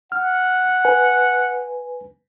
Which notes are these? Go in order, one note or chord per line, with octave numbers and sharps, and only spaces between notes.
F#5 F6
B4 G#5